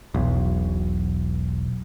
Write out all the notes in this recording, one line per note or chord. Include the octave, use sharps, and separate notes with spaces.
E1 B1